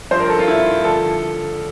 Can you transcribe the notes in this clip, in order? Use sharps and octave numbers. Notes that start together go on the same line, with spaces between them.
G2 F3 C5
A#4
A4
F4
E4
D3 F3 A4